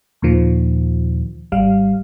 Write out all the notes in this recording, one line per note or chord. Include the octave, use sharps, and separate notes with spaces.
D#2 A#2 D#3 F3
G#1 G3 F5